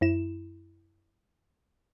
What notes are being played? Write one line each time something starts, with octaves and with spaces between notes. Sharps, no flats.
F#2 E4 E7